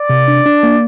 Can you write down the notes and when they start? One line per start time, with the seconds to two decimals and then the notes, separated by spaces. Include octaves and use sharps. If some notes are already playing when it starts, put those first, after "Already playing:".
Already playing: D5
0.10 C3
0.28 D4
0.46 D4
0.63 A#3